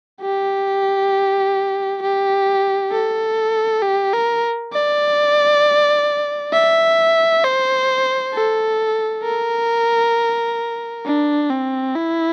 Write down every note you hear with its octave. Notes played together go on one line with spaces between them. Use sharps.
G4
G4
A4
G4
A#4
D5
E5
C5
A4
A#4
D4
C4
E4